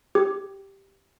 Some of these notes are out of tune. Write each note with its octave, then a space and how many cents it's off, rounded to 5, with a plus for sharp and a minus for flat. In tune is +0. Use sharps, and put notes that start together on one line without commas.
G4 +0